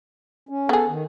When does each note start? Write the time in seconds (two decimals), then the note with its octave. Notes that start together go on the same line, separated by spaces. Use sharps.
0.49 C#4
0.69 B3 G#4 A4
0.88 D#3